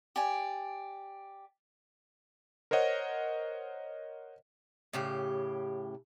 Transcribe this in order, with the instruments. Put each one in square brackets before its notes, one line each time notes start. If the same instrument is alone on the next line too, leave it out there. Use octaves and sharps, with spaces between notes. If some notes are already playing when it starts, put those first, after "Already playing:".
[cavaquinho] G4 D5 G#5
[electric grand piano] A#4 C5 C#5 D#5 F#5
[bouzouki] A2 C#3 G4